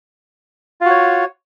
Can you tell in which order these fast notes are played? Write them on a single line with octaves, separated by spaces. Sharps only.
F4 F#4 C#5